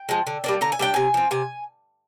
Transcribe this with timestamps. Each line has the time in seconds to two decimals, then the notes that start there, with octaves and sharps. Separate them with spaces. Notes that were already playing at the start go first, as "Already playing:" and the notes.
Already playing: G5
0.09 F3 G#3
0.27 D3
0.44 G3 A#3 D4
0.61 D3 A#5
0.72 G#5
0.79 G3 A#3 D4 G5
0.94 C3 G#5
1.14 F3 C4
1.31 C3 G#5